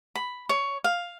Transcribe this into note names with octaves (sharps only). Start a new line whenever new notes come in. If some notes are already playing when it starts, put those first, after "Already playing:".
B5
C#5
F5